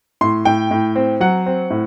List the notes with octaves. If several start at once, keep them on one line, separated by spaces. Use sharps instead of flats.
A2 C6
A2 G5
A2
C4
F#3 F#5
C4
A2